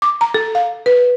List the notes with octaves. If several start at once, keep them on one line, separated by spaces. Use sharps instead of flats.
D6
A#5
A4
F5
B4